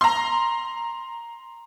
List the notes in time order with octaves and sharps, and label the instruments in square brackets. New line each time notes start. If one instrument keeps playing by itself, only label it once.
[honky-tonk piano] A#5 C6